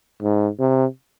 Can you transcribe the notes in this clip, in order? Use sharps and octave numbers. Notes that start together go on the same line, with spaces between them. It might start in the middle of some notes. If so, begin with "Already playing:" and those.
G#2
C3